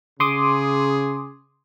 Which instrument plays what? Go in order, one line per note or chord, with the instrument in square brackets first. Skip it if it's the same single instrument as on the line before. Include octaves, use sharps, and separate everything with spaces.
[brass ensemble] C#3 G#4 [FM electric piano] C6 D6 D#6